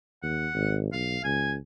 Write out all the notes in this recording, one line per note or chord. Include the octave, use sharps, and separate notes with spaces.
D#2 F#5
G#1
B1 F5
C#2 G#5